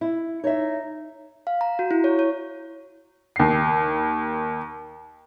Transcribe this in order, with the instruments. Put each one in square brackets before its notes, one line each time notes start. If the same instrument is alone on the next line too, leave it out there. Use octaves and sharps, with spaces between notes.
[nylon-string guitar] E4
[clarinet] D#4 [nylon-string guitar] C#5 E5
[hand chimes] F5
A#5
F#4
E4
C#5
C#5
[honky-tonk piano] D#2 C7